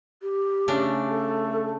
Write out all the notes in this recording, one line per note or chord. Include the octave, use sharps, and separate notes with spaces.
G4
C#3 A3 D4
A4